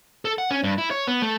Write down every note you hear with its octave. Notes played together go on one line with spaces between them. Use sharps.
A4
F#5
C#4
G2
E4
C#5
B3
A3